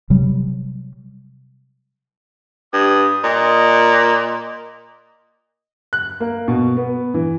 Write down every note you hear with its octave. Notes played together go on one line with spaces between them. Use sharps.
C3 F#3 G3
G2 D#6
A#2 D#5
F#6
A#3
B2
B3
E3